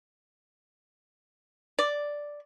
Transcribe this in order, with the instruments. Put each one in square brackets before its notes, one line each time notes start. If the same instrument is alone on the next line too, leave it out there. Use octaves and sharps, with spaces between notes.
[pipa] D5